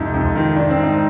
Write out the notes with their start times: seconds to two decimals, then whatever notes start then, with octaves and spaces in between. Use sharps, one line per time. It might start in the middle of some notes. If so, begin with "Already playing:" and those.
Already playing: F2 G#2 C3 D#4
0.14 F2
0.35 D#3
0.56 D#3 D4
0.70 C4
0.77 G#2
0.83 D#4